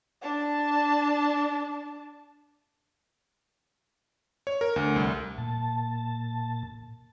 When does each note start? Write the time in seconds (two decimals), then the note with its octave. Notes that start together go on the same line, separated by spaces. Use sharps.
0.22 D4 A5
4.47 C#5
4.61 A#4
4.76 D2
4.96 C2
5.38 A#2 A5